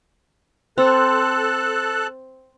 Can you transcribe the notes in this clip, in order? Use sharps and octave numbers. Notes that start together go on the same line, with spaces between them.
C4 A4 A5 F#6